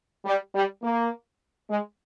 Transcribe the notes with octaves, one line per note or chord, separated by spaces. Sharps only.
G3
G3
A#3
G#3